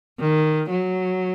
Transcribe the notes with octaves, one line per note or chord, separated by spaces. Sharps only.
D#3
F#3